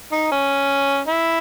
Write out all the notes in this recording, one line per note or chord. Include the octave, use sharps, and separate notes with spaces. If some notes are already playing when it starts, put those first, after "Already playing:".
D#4
C#4
E4